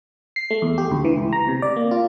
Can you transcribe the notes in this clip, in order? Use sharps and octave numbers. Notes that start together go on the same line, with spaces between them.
C7
A3
E2
G4
D2
E3
C#2
A#5
C3
D5
A#3
F4